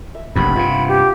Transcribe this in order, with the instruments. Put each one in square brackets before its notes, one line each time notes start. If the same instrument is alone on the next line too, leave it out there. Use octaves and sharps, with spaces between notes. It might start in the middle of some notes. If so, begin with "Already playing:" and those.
[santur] E5
[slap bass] F1 A#1 F#2 [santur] B3 G4 [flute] B5
[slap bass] G2 C3 [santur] F4
[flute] G4